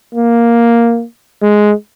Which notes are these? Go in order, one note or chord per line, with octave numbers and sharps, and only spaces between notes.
A#3
G#3